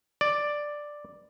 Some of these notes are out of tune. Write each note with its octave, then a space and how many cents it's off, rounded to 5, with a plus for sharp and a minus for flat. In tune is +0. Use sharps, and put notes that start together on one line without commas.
D5 +5